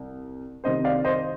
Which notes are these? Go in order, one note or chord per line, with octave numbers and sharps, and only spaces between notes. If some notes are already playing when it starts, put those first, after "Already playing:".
Already playing: C2
C2 C3 D#3 C5 D#5
D5 F5
C5 D#5